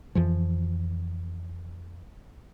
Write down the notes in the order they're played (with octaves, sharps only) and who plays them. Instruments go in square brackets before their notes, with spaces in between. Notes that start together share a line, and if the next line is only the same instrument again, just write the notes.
[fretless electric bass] F2 E3 F3